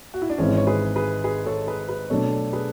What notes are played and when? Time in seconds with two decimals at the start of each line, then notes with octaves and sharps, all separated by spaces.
0.14 F#4
0.22 E4
0.30 D4
0.38 G#1 G#2 E3 C#4
0.57 C#5
0.67 G#4 B4
0.96 G#4 B4
1.24 G#4 B4
1.46 A4 C#5
1.67 G#4 B4
1.89 G#4 B4
2.10 B2 F#3 A3 D4 A4 C#5
2.53 G#4 B4